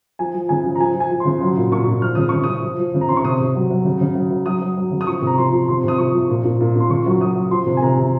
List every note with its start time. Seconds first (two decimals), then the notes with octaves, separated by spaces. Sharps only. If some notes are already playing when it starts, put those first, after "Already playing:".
0.19 F3 G#5
0.34 F3
0.49 C#3 G#5
0.65 F3
0.75 A#5
0.80 F3 G#5
0.95 F3
1.00 G#5
1.11 F3
1.20 C6
1.25 C#3
1.41 F#3 C6
1.57 A#2
1.71 A#2 C#6
1.87 A#2
2.02 F3 F6
2.15 C#3 D#6
2.29 C#3 C#6
2.44 F3 D#6
2.63 F3
2.79 F3
2.94 C#3
3.01 A#5
3.09 C#3 C6
3.17 C#6
3.24 C3 D#6
3.40 C3
3.55 F#3
3.70 F#3
3.85 C#3
4.01 C#3
4.15 F#3
4.31 F#3
4.46 F#3 D#6
4.62 F#3
4.77 F#3
4.91 C#3
5.01 D#6
5.07 F3 C#6
5.22 C3 A#5
5.38 F3 C6
5.52 F3
5.68 C3 C6
5.84 C3 D#6
5.98 F3 C#6
6.14 F3
6.30 A#2
6.44 A#2
6.60 A#2
6.75 A#2
6.80 C6
6.90 C#3 C#6
7.06 F#3 C#6
7.20 F#3 D#6
7.36 F#3
7.51 F3 C6
7.66 C3
7.77 G#5
7.82 C3 A#5
7.97 C3